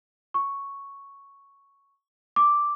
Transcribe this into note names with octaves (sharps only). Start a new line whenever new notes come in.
C#6
D6